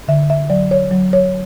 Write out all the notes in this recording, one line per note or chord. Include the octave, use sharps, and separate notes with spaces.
D3 E5
E5
F#3 D5
C#5
F#3
C#5